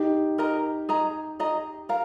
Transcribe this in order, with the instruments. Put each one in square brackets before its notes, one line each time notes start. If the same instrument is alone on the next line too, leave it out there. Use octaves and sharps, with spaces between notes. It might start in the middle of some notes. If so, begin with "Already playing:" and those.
Already playing: [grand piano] D#4 G4
[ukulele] A#4 D#5 A#5
G#4 D#5 A#5
G#4 D#5 A#5
A#4 F5 A#5